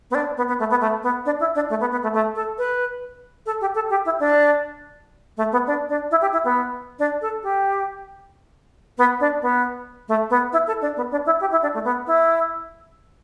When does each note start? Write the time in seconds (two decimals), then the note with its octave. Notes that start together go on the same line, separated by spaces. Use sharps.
0.11 B3
0.15 D4
0.37 B3
0.48 B3
0.59 A3
0.70 B3
0.81 A3
1.03 B3
1.26 D4
1.40 E4
1.55 D4
1.70 A3
1.81 B3
1.91 B3
2.03 A3
2.14 A3
2.35 A4
2.58 B4
3.46 A4
3.61 G4
3.75 A4
3.90 G4
4.05 E4
4.20 D4
5.37 A3
5.52 B3
5.67 D4
5.89 D4
6.11 E4
6.21 G4
6.33 E4
6.44 B3
6.99 D4
7.22 A4
7.43 G4
8.98 B3
9.20 D4
9.42 B3
10.08 A3
10.30 B3
10.53 E4
10.67 A4
10.81 D4
10.97 B3
11.11 D4
11.26 E4
11.41 G4
11.51 E4
11.62 D4
11.74 A3
11.84 B3
12.07 E4